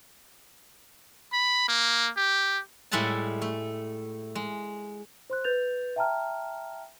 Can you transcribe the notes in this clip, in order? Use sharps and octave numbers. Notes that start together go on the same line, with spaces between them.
B5
A#3
G4
A2 G3 G#3 E5 F#5 A5
A3
G#3
C5 C6 F#6
B4 G6 A6 F7
E5 G5 A5 A#5 F6